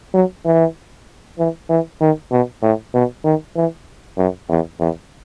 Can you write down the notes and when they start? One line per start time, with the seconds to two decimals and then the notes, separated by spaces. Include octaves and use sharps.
0.14 F#3
0.45 E3
1.38 E3
1.70 E3
2.01 D#3
2.31 B2
2.62 A2
2.94 B2
3.24 D#3
3.56 E3
4.18 F#2
4.49 E2
4.80 E2